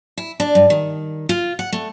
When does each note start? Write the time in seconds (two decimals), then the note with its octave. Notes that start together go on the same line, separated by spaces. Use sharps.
0.18 E4
0.40 D4
0.55 G2
0.70 D#3
1.29 F4
1.59 F#5
1.73 A3